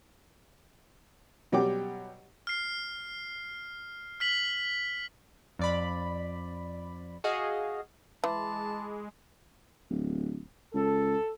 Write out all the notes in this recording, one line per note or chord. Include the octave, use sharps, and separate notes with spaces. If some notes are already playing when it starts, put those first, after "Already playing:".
B2 F#3 G3 G4 G5 D6
F6 C7
F6 B6 F#7
F2 D5 B5
F#4 G#4 D#5 F5
E3 G#3 A5 B5 C6 D6
D1
C#2 A4